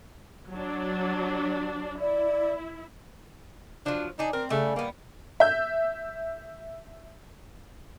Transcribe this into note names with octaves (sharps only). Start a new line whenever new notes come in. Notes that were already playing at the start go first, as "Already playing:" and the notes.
F#3 D4
E4 D5
F3 F#3 D4
D4 D#4 G#4
C4 A#4
C#3 G3 A3
G3 A#3 B3
E5 G6